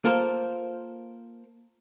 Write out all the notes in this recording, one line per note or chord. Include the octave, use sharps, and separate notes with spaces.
A#3 F4 A4 A#4 C5